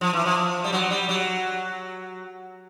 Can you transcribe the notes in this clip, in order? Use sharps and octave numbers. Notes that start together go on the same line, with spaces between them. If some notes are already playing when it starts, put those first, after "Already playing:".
F3
E3
F3
G3
F#3
G3
F#3